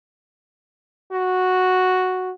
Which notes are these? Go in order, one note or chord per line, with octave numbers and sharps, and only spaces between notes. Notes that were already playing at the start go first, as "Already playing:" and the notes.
F#4